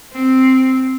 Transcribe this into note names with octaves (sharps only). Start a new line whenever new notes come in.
C4